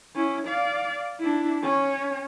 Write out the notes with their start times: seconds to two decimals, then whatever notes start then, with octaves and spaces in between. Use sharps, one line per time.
0.15 C#4 E4
0.47 D5 F5
1.20 D4 E4
1.62 C#4 C#5